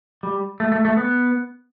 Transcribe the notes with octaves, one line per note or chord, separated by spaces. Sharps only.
G3
A3
A3
A3
B3